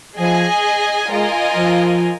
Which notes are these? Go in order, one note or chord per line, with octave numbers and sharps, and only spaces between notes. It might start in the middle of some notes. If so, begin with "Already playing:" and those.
F3 G#4 D#5 G#5
G#3 F4 A#4 D#5 G#5
F3